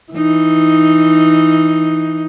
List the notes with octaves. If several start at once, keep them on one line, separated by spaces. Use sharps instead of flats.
E3 D#4